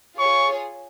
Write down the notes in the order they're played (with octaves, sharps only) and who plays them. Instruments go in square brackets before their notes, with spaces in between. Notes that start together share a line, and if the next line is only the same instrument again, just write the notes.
[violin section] F4 G#4 C#5 [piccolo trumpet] C#6